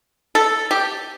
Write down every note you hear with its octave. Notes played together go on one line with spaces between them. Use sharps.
A4
G4